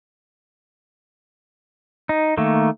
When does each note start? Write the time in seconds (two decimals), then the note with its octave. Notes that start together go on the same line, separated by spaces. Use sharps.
2.09 D#4
2.38 D#3 A3 A#3